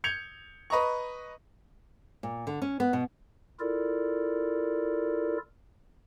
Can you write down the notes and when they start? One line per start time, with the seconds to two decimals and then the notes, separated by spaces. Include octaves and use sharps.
0.04 G6 G#6 C#7 F7
0.70 B4 D#5 A#5 C#6
2.23 A#2
2.47 D3
2.62 C#4
2.80 B3
2.93 B2
3.60 E4 F4 A4 A#4 D5